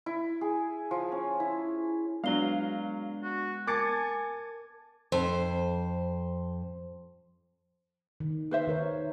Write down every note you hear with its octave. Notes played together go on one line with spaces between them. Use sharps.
E4
G#4
F3
C#4
E4
F#3 G#3 B3 D4 D5 F5 G7
F#4
A#4 G#5 A5 D6 A6 C#7
F2 C5
D#3
B4 C5 E5
D#3 A#4 C#5